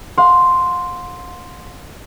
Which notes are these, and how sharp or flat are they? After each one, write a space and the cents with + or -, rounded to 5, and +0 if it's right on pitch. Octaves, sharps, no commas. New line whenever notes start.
F5 +45 C6 +0